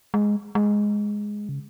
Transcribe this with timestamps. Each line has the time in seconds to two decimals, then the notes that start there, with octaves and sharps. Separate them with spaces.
0.14 G#3
0.55 G#3
1.49 C#3